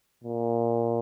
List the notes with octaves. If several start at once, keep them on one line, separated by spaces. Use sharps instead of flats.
A#2